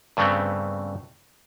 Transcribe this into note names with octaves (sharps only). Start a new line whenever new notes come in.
G2 C#3 A3 B3 C4